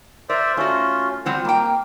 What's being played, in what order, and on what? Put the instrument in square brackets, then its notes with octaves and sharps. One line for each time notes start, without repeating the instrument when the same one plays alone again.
[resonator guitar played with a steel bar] A#4 [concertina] C5 D5 E5
[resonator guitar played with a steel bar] A3 F#4 [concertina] C#4 F4
[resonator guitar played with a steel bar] G3 C4 F4 [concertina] C5 F#5
[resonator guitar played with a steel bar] G3 G5 [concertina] A#3